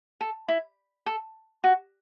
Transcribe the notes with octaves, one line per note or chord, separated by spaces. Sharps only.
A4
E4
A4
F#4